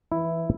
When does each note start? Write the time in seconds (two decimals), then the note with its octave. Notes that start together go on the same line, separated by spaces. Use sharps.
0.12 E3 E4